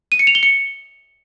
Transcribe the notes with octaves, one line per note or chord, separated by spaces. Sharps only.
D#7
C#7
F7
G7
C#7